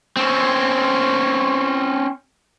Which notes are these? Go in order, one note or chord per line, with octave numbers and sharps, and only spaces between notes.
C4 C#4